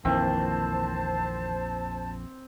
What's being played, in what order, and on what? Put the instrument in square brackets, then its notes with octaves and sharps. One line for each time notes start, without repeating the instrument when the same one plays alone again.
[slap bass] A#1 F2 [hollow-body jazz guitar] D#3 E3 A#3 [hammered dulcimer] C4 [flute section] C5 A5